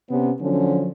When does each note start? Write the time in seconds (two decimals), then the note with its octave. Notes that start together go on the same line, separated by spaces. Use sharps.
0.10 C3 B3 C#4
0.41 D3 F3 F#3 C#4